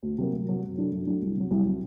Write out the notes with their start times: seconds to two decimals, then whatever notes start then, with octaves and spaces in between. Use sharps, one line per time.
0.03 D2
0.18 C3 F#3 A#3
0.32 D2
0.47 C3 F#3 A#3
0.63 F#2
0.77 F#3 A3 D4
0.92 F#2
1.07 F#3 A3 D4
1.22 C2
1.36 C3 F#3
1.51 C2
1.65 C3 F#3